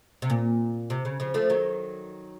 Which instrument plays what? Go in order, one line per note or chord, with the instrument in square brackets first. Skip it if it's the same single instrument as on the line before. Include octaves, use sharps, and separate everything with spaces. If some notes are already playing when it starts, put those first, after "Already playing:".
[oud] C3
A#2
C3
C#3
C#3 F3
F3 A3
D#3 F#3